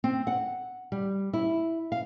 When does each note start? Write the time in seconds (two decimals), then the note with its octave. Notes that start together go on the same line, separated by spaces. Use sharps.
0.04 C4
0.27 F#5
0.92 G3
1.33 E4
1.92 F5